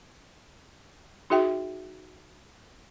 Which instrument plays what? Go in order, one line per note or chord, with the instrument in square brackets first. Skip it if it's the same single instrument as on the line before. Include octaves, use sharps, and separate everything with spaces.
[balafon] D#4 F#4 G#4 E5 G5